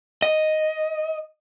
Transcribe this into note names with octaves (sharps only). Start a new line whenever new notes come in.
D#5